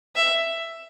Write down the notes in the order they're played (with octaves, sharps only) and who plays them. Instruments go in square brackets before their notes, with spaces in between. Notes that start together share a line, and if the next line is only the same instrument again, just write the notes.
[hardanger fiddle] E5